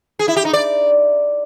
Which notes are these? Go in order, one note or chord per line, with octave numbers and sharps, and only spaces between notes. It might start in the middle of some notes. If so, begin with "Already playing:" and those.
G#4
E4
G4
D#4
D5